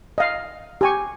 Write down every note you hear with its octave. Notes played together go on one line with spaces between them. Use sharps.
D#5 F5
G4 G#5 C#6